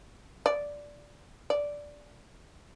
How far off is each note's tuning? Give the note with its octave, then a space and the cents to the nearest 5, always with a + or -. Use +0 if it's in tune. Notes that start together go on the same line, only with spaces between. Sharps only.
D5 -5
D5 -5